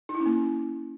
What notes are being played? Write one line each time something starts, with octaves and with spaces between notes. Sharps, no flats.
D#4
E4
C#4
A#3